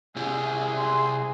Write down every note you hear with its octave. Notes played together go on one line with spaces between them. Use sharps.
C3 E4 G4 G#4
C6